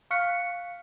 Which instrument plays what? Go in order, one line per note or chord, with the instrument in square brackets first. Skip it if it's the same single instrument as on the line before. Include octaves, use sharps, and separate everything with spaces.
[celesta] F5 C#6 F6 F#6 B6 C#7